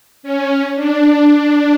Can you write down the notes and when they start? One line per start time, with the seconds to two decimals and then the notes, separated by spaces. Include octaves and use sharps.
0.23 C#4
0.76 D4